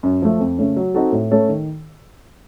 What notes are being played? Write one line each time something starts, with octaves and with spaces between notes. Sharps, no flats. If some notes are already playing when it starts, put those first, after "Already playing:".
F#2
F3 A3
F2
C#3 A3 C#4
F#3
C4 D#4 F#4 A4
A2
A3 C#4 A4 C#5
D#3